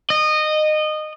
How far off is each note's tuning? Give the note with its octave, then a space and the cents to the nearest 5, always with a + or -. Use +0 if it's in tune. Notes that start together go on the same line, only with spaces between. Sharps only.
D#5 -20